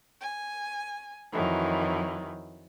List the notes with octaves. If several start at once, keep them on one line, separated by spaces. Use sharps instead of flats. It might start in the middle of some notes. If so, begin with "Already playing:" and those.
G#5
F2 D#3 E3 F#3